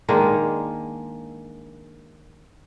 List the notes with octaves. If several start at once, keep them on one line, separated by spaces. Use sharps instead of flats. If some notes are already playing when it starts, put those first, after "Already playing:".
D#3 G#3 A#3 D4